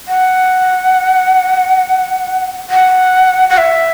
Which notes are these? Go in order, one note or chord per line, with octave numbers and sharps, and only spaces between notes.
F#5
F#5
F#5
E5